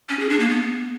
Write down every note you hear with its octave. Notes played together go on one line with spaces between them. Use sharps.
C#4
G#4
D4
A#3
B3